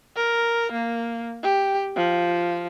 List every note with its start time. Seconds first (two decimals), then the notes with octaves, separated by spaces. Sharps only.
0.16 A#4
0.72 A#3
1.43 G4
1.96 F3